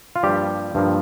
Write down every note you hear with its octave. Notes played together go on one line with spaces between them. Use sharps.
F4
G2 F3 G3 A#3 G4
G2 F3 A#3